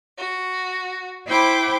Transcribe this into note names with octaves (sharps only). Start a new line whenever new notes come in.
F#4
E4 C5 G5 B5 D6